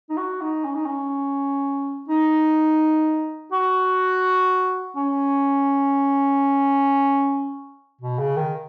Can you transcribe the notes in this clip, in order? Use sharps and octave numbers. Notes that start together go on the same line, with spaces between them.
D#4
F#4
D#4
C#4
D#4
C#4
D#4
F#4
C#4
B2
C#3
D#3